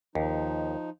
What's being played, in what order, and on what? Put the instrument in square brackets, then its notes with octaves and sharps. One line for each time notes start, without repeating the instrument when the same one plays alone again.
[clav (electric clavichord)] D#2 [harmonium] F3 D#4